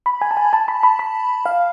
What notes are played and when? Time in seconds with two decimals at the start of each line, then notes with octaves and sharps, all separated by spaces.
0.06 B5
0.21 G#5
0.31 A5
0.37 G#5
0.53 A5
0.68 B5
0.83 B5
0.99 B5
1.46 F5